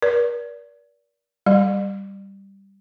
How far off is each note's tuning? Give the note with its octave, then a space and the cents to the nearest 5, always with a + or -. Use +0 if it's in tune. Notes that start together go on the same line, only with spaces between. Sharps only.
A#4 +45 D5 -30
G3 +0 D5 +40